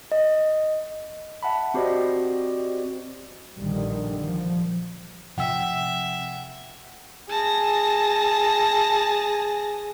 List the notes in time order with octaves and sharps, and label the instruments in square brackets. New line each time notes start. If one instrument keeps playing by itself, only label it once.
[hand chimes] D#5
[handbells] E5 F#5 A5 B5
C4 F#4 G4 C5 D5 D#5
[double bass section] A#1 D3 D#3 G3
F3
[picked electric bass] C3 F3 [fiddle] E5 [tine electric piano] F#5 G5 E6
[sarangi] G#4 [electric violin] A5 A#6